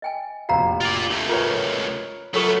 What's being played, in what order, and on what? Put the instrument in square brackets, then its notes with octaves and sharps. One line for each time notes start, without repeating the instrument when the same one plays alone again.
[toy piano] D#5 G5 G#5
[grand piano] F1 A#1 C7 [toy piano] F#4 F5 A#5
[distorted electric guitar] F4 D5
C#2 A3
[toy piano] F4 [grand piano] A#4 B4 C#5
[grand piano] F#3 C#6 [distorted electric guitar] A3 B3 [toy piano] F4 A4 B4